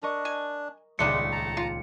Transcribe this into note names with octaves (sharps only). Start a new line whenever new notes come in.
D4 A#4 D#5 C#6
G#5
D#1 C#2 G#3 A3 D4 D#4 F#6 C#7
A5 A#5
F4